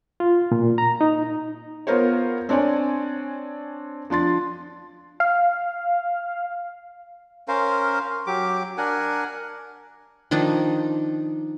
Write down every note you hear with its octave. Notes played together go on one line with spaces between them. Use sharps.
F4
A#2
A#5
D#4
B3 F4 A#4 C5 C#5
C4 D4 C#5 D5 G#5
F3 D4 C6 A6
F5
C#4 A#4 C5 F5
F#3 G4 D6
D4 A#4 F#5 G#5
D#3 F3 D4 D#4